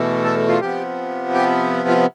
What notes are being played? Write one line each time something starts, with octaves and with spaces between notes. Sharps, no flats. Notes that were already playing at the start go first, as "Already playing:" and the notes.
Already playing: E2 B2 A3
A4
F4
C3 F3 B3 G4
G4
F4